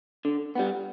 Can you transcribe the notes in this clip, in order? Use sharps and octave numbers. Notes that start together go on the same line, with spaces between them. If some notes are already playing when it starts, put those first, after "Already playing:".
D3
G3 B3